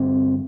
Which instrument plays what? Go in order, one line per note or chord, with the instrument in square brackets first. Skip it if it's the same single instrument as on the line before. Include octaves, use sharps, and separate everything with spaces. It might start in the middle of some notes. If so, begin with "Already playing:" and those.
Already playing: [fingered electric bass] G2 D3 C4